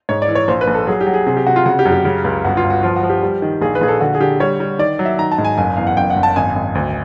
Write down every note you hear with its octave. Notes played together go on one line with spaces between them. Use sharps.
G#2 C#5
D5
E3
C#5
A#1 C5
B4
A#1
A4
F#3 G#4
G4
F#3
G#4
C3 G#4
G4
C3 F#4
F4
C#3 F#4
G4
F#2
G4
C#3 G4
C#2
G1 F#4
F4
G1
F#4
F3 F4
F#4
F3
G4
G3
D#3
A#1 G#4
B4
A#1 G#4
A4
D3 F#4
G#4
D3 G4
G3 C#5
G3
D#3 D5
F#3
E5
D#3 A#5
A5
G#2
G#5
F#1 G#5
E2 F5
F#5
F#1 G5
F#5
F#1
A5
G#1 G#5
G#1
D2